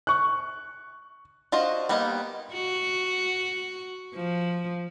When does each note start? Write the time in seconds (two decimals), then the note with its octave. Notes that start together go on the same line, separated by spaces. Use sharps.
0.07 C#6 F#6
1.52 D4 F4 F#4 C5 D#5
1.89 G3 A#3 B3 D#4 D#5
2.53 F#4
4.15 F3